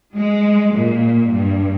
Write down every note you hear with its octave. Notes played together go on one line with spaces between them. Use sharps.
G#3
A#2
G2